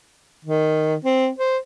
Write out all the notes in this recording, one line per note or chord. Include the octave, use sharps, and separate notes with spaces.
D#3
C4
C5